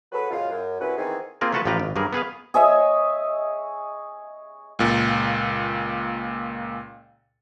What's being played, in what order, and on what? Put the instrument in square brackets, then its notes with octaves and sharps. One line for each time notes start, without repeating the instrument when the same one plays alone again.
[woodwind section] F#3 F#4 G#4 A4 B4
F#2 A#2 C#3 G#3 F4
F#2
C2 C#4 E4 F#4 B4
D#3 E3 B3 C4 D#4 G#4
[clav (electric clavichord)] A#3 C4 F4 G#4 A#4
A3 F4 F#4 A4 B4 A5
A1 F3 F4 G4 B4 A#5
G#1
G2 F#3 G3 G#4 A#4
B3 G#4 B4 F5
[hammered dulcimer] G#4 C#5 D#5 E5
[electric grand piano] C#2 A#2